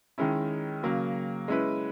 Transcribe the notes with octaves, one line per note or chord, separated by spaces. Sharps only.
D#3 G#3 C#4 E4
C#3 F#3 A#3
G#3 C#4 E4 B4